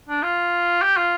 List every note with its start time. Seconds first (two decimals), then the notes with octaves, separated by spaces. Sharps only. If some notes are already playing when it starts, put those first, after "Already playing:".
0.09 D4
0.23 F4
0.82 G4
0.97 F4